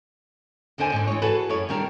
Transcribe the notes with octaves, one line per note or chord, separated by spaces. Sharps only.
D#2 D3 D4 C5 G#5
G#2 D4
E3 G#3 C#5
F#4 G#4 A4 B4
F#2 E4 C#5
D#3 G3 D4 A#4